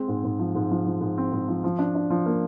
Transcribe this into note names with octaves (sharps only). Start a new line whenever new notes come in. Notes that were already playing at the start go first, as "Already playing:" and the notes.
Already playing: G#3 C4
G#2
G#2
F3
G#2
F3
F3
G#2
C4
G#2
F3
F3
D4
D4
F3
A#3